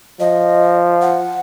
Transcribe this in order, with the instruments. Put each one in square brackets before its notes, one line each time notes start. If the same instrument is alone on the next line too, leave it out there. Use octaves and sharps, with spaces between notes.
[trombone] F3 [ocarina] D#5
[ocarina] F#5